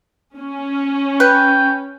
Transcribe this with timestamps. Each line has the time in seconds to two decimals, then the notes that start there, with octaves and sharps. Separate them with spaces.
0.38 C#4
1.20 B4 G5